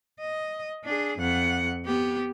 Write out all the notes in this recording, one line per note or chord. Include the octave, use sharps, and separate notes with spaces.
D#5
D4 G#4
F2 F#5
B3 G4